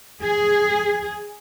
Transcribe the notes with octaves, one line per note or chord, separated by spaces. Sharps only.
G#4